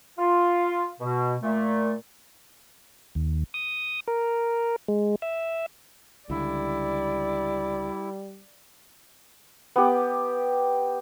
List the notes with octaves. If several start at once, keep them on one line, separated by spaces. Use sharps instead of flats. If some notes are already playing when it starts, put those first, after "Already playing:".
F4
B2
A#2 A3
D#2
D#6
A#4
G#3
E5
C#2 D3 G3 E4 D5
B3 G4